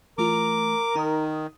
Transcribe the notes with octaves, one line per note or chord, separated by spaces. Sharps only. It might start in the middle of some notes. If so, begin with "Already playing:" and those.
E3 A3 F4 A#4 D6
D#3 D#4 D#6